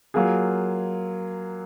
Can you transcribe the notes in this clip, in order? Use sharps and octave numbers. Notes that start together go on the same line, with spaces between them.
F#3 A#3 F4 G#4